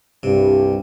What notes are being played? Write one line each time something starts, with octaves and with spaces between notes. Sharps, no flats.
C2 G2 C3